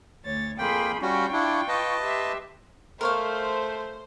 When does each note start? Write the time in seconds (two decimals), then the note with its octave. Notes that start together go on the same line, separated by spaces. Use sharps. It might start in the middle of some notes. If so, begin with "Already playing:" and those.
0.24 D2 C#5 A6
0.58 F2 A#3 G#4 G5 B5 C6
1.02 G3 C#4 F4 F#4 G5 C#6
1.32 D4 E4
1.68 B4 D#5 A5
2.01 G4 E5 C6
3.01 A3 A#4 C5 C#5 F5